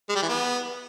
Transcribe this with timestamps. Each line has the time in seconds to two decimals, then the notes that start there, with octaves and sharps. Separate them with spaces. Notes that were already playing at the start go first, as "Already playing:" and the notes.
0.09 G#3
0.16 G3
0.22 E3
0.28 B3